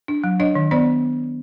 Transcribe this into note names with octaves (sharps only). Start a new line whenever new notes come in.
D4
F#3
D4 C#5 D#5
D#3
B3 C5 D5